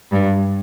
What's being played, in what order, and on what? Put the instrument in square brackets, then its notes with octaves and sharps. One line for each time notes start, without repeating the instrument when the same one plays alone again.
[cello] G2